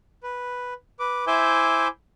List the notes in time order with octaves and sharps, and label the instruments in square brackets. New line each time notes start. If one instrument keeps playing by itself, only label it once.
[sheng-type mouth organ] B4
B4 D6
E4 C5 E5 G#5 D6 G6